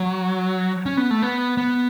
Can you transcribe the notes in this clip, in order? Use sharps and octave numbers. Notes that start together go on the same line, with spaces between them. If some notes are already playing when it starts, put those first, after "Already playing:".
Already playing: F#3
C#4
B3
A3
B3
B3